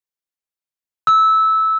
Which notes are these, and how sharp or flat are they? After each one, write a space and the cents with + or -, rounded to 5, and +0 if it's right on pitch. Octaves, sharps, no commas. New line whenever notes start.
E6 -15